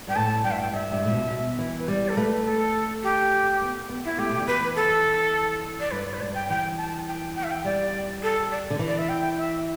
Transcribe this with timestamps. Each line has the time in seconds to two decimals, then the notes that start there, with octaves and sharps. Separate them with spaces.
0.07 G2 G5
0.16 A2 A5
0.44 G2 G5
0.51 E5
0.59 G5
0.72 G2 E5
0.92 G2
1.05 A2
1.11 B2
1.30 B2
1.59 E3
1.78 B4
1.88 G3 D5
2.09 A4
2.17 A3 B4
2.46 A4
3.03 G4
3.62 B3
3.89 B3
4.05 E4
4.18 A3 G4
4.31 B2
4.39 D3
4.47 E3 B4
4.76 A4
5.80 D5
5.91 G2 B4
6.06 D5
6.14 B4
6.20 G2 D5
6.35 G5
6.49 E3 G5
6.78 A5
7.07 G5
7.35 G5
7.44 E5
7.51 G5
7.65 G3 D5
8.23 A4
8.51 D5
8.70 D3
8.79 E3
8.87 D5
8.98 E5
9.09 G5
9.38 E5